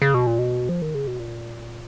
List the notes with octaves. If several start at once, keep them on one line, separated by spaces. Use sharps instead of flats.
C#3
B2
A#2
B2
F3
D#3
C#3
B2
A#2